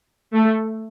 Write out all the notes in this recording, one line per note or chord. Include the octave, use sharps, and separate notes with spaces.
A3